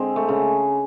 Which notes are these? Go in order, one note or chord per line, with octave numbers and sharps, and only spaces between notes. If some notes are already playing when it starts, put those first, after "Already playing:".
Already playing: D3 G#3 C4
A3
C#3